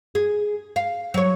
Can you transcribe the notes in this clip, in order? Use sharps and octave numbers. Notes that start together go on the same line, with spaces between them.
G#4
F5
F#3 C#5